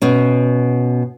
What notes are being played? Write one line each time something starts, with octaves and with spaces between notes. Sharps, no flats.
B2 C#4